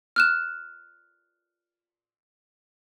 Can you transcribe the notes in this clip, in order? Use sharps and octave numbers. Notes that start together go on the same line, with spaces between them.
F6 F#6 E7